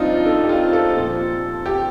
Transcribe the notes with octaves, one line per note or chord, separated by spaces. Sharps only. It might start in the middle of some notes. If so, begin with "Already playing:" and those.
Already playing: G2 F3 C4 D4 D#4 F4
A4
G4
F4
A4
A#2 F3
G4